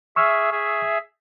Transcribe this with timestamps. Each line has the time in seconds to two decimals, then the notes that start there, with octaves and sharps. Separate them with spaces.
0.16 G#4 E5 C#6 E6 F6
0.52 G#4 E5